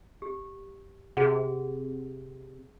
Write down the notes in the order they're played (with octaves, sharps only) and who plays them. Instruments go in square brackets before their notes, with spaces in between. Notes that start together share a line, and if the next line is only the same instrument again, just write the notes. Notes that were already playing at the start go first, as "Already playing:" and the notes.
[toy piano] G4
[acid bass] C3 [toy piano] F#4 G#4 F#5